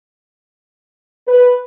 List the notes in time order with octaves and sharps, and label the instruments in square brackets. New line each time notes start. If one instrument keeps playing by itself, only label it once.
[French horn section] B4